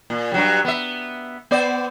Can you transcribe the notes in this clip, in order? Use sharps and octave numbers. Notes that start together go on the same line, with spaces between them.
A#2
G2 F#3 G3
B3 E5
B3 C5 D5